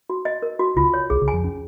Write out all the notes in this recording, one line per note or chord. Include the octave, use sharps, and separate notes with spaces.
F#4
D#5
A#4
F#4
C#2 C#3 F4
C#5
C2 C3 G#4
C#2 C#3
G#5
F2 F3
C#4